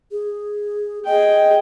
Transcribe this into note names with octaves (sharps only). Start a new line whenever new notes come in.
G#4
G#4 D#5 G5